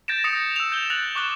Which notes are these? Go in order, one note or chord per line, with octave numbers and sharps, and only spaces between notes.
G6 A6 A#6 D7 E7
D#6 A#6 C#7 F7
E6 F7
G6 E7 G7
F#6 A6 F7 F#7
C#6 D6 F#6 G7